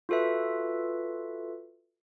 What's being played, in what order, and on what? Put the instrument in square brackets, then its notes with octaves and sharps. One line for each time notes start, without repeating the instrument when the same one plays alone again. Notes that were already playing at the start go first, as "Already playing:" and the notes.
[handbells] F4 F#4 A4 B4 E5